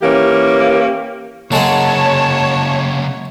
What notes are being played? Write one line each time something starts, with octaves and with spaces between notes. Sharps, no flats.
E3 A#3 C#4 G4
C#3 F#3 G#3 A#3 G#4 C#5 A5